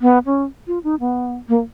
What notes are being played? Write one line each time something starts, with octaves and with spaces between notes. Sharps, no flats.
B3
C#4
F4
D#4
B3
A#3